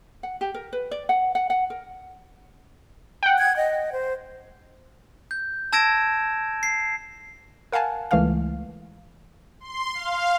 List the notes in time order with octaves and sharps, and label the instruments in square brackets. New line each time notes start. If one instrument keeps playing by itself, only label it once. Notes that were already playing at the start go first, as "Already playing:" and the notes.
[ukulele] F#5
G4
A#4
B4
D5
F#5
F#5
F#5
A#4
[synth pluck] F#5 G5
[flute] G#6
D#5
C5
[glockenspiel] G6
A5 E6 G#6 A#6 D7 E7
C7
[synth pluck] A#4 F5 F#5 G#5 A5
C#2 E3 A3 A#3 F5 F6
[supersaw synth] C6
F5